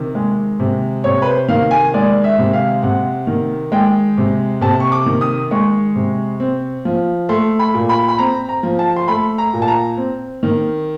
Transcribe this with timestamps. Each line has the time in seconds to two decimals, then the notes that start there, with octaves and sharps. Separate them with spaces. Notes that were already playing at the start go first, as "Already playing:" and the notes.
Already playing: C3 D#3
0.15 G#3
0.60 C3
1.04 C3 C#5
1.22 B4
1.27 C5
1.48 D#3 F5
1.71 G#5
1.94 G#3 D5
2.24 E5
2.38 C3
2.53 F5
2.82 C3 F#5
3.27 D#3
3.72 G#3 G5
4.18 C3
4.61 C3 A5
4.80 C#6
4.92 D6
5.06 D#3
5.21 D#6
5.51 G#3 C#6
5.95 C3
6.40 C4
6.85 F3
7.29 A3 C6
7.59 B5
7.74 A#2
7.89 B5
8.08 B5
8.18 C4 A#5
8.49 A#5
8.63 F3
8.79 A5
8.96 C6
9.08 A3 B5
9.38 A#5
9.53 A#2
9.62 A5
9.68 A#5
9.97 C4
10.43 D#3